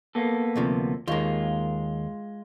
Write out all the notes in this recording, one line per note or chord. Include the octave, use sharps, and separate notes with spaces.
A#3 B3 A4
D2 C3 F3
D#2 G#3 A#3 F4